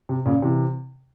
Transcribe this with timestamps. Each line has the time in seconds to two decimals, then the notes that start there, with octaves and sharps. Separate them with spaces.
0.09 C3
0.25 A#2 C#3
0.42 C3 E3